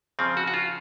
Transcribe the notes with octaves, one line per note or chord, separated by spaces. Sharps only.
C#3 F3 C4
F#4
F#4
F4